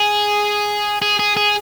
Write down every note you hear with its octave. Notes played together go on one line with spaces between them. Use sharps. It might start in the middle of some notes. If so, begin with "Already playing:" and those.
Already playing: G#4
G#4
G#4
G#4